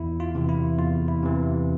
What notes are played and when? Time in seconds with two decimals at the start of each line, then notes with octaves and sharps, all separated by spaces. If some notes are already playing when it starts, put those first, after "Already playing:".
Already playing: E2 E4
0.20 F4
0.35 C3 E3
0.49 E4
0.78 E2 F4
1.08 E4
1.23 C3 E3